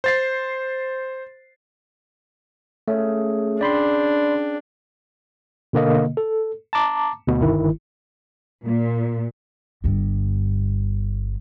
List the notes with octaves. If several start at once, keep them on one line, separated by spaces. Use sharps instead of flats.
C5 A6 C7
C#3 A3
D4 D5 G5 B5 C6
B2 D3 A#3 D#5
A4
A5 A#5 D6
D2 B2
G1 D#3 E4
A#2
G1 G2